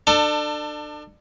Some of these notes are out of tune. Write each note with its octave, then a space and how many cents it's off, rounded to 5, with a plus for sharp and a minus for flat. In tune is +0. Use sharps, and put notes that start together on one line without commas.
D4 +30 A4 +20